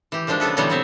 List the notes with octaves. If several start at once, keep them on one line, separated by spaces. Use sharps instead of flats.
E3 G4
D#3 F3 G#3 D4
C#3 A3 B3 A4 B4
B2 D3 E3 F#3 G3 B3
F#3 G3 C4 E5